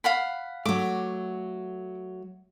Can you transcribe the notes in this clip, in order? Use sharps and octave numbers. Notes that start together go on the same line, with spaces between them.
F5 F#5 B5
F#3 A3 D6